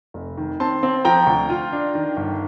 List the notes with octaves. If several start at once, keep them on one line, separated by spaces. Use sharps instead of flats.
F1
D#3
C4 A5 C6
C4
F3 G5 A#5
D2
F4
D4
D#3
G1